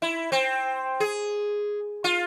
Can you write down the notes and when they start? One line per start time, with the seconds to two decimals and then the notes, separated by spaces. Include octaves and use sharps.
0.02 E4
0.32 C4
1.00 G#4
2.04 F4